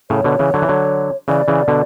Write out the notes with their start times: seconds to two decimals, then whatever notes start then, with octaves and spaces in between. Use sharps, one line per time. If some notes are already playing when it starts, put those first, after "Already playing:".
0.10 A2 C#3 C#5
0.24 B2 D3
0.39 C#3 E3
0.54 D3 F#3
0.62 E3
0.69 D3 F#3
1.28 C#3 E3 D5
1.48 C#3 E3
1.68 B2 D3